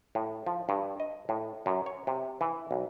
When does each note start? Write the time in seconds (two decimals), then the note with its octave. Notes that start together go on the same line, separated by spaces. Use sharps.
0.15 A2
0.47 F3
0.69 G2
1.00 D#5
1.29 A2
1.66 F#2
1.86 C#5
2.07 C3
2.41 E3
2.71 B1